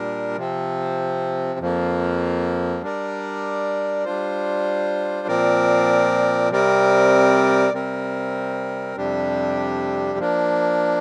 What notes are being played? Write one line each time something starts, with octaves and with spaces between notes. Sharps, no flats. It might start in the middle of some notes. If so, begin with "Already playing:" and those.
Already playing: A#2 G3 D4 A#4
C3 F3 C4
F2 F3 A#3
G3 D4 A#4 D5
G3 D4 F4 C5
A#2 F3 C4 A#4 D5
C3 G3 C4 A#4 D5
C3 G3 C4 A#4
F2 C3 G3 D4 G4
F3 A#3 D4